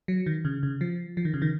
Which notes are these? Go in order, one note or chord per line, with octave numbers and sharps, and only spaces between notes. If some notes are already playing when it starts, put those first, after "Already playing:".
F#3
D#3
C#3
C#3
F3
F3
D#3
C#3
D#3